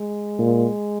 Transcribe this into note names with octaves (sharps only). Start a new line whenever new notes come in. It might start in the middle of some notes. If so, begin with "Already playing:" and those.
Already playing: G#3
A#2